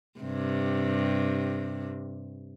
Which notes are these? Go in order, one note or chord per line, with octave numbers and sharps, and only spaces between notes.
G2 C3